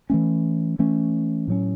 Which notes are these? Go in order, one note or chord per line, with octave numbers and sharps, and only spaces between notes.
E3 A3 C#4
E3 A3 C#4
A2 F#3 C#4